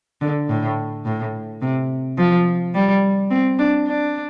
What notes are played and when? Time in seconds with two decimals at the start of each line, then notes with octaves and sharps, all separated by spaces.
0.21 D3
0.49 A2
1.06 A2
1.62 C3
2.18 F3
2.75 G3
3.31 C4
3.59 D4
3.87 D4